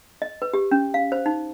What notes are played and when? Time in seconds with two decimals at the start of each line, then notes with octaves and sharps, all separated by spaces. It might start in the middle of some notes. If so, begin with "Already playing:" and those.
0.22 D#5
0.42 B4
0.53 G4
0.71 C#4
0.94 F5
1.12 C5
1.26 D#4